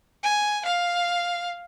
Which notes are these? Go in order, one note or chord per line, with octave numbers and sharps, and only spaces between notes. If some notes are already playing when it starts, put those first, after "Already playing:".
G#5
F5